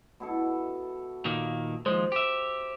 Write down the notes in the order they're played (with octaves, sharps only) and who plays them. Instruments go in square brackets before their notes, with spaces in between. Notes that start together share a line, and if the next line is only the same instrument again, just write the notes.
[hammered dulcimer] B2 E4 A4
[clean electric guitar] A#2 D#3 A#3
[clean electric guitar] D#2 F3 G#3 [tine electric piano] C5
[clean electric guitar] G4 E5